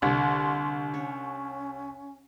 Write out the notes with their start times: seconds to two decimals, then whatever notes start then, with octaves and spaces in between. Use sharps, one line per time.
0.02 C2 D3 C6
0.94 C#4 C#5